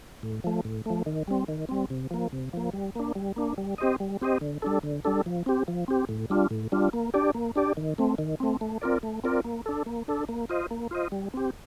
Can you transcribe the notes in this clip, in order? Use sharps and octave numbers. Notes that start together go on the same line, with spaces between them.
A2
F3 A3
A2
F3 A3
D#3
G3 C4
D#3
G3 C4
C3
F3 A#3
C3
F3 A#3
G3
A#3 D4
G3
A#3 D4
G3
C4 G4 C5 D#5
G3
C4 G4 C5 D#5
D3
G3 D4 A4
D3
G3 D4 A4
F3
C4 G4
F3
C4 G4
A2
G3 D4 F4
A2
G3 D4 F4
A#3
D4 G4 D5
A#3
D4 G4 D5
D#3
A3 C4
D#3
A3 C4
A3
C4 F4 A#4 D5
A3
C4 F4 A#4 D5
A#3
D4 A4
A#3
D4 A4
A#3
F4 C5 D#5
A#3
F4 C5 D#5
G3
C4 G4